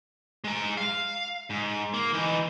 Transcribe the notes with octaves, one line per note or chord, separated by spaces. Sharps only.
G#3 A#5
F5
G#2
A#3
E3 D#4